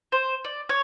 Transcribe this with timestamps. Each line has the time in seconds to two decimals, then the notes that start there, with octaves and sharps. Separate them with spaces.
0.12 C5
0.45 D5
0.69 C#5